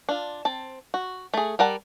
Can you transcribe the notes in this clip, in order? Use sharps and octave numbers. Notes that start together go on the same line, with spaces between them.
D4 F4
C4 A5
F#4
A3 G#4
G3 A#4 F#5 A5